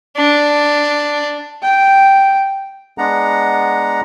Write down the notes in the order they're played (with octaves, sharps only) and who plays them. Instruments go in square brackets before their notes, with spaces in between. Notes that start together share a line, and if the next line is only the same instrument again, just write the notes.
[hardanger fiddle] D4
[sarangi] G5
[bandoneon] G#3 B3 D4 F#5 A#5